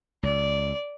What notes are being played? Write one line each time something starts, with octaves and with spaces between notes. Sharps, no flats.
C#2 D5